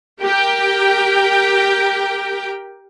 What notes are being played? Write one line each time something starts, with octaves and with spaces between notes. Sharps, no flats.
G4 A#4 G5